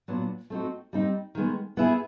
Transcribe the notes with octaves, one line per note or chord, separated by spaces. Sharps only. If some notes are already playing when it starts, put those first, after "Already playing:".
A#2 F#3 B3 D4
A3 C4 D#4 F#4
G3 C4 D#4
D#3 G#3 B3
B3 E4 G#4